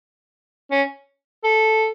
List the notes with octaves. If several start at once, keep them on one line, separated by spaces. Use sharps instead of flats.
C#4
A4